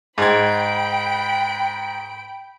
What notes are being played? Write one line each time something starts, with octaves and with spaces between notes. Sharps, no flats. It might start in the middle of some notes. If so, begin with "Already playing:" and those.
G#2 G5 B5 G#6 D7